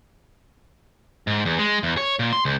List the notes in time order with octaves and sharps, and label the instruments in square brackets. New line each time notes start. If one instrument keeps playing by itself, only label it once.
[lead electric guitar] G#2
E2
G#3
E2
C#5
A#2
C6
C#2